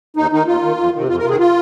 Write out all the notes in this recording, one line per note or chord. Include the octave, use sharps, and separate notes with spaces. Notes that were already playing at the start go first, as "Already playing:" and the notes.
D#2 D#4
D#3 D#4
D#2 F4
D#3
F2
C3 D#3
F2 F4
A#4
C3 D#3 F4 G#4
F4